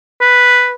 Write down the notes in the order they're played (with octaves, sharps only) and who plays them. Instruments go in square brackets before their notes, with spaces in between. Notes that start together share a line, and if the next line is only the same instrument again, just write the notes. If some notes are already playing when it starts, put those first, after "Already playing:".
[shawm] B4